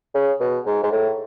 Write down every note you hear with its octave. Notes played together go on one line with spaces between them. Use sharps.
C#3
B2
G#2
G#2
A2